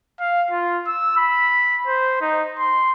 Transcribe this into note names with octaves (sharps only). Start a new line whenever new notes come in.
F5
F4
E6
B5
C5
D#4
C6